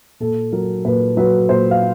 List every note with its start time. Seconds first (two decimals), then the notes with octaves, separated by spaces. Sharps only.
0.20 A#2 A4
0.53 F#3 A#4
0.85 A#2 B4
1.17 F#3 B4
1.49 A#2 C5
1.71 F5